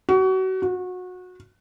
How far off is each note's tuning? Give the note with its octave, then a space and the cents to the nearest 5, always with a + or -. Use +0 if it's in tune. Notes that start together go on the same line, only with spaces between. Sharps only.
F#4 +30
F#4 -25